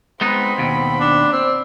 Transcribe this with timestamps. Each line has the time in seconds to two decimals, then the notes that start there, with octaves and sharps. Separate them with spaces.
0.21 G#3 B3 C4 D#4 B5
0.58 D#2 B2
1.00 D4
1.33 C4 D5